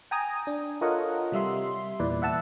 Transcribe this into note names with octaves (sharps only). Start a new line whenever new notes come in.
G5 G#5 A#5 D#6
D4
F4 A4 A#4 C#5 D#5 F#5
C3 G3 E5 C6
E2 A#2 E4 B4 D5
E5 F#5 A5 E6